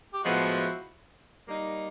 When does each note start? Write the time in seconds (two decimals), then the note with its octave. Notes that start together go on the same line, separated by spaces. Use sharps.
0.13 G4
0.23 A2 F3 G#3 B3 E4 F#4
1.47 G3 A#3 D#4